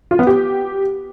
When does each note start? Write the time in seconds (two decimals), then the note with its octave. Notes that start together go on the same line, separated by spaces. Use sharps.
0.11 F4
0.19 B3
0.27 G4